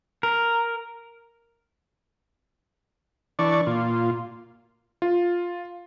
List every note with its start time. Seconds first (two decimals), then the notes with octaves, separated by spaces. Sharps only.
0.23 A#4
3.39 E3 D4 D5 C#6
3.67 A#2 F4
5.02 F4